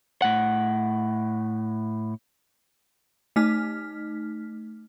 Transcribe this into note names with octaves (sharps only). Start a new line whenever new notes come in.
A2 F#5
A3 D#4 F6 B6